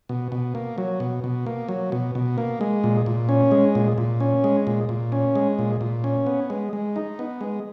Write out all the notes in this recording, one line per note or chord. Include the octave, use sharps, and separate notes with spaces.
B2
B2
A#3
F#3
B2
B2
A#3
F#3
B2
B2
A#3
G#3
A#2
A#2
C#4
G#3
A#2
A#2
C#4
G#3
A#2
A#2
C#4
G#3
A#2
A#2
C#4
B3
G#3
G#3
D#4
B3
G#3